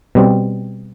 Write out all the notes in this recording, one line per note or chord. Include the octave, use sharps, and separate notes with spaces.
B2 G3 C4